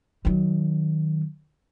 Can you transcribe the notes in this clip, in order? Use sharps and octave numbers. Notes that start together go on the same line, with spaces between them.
D#3 F#3